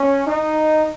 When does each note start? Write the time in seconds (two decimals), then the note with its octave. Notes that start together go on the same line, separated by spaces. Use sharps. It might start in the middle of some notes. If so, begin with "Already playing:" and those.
Already playing: C#4
0.27 D#4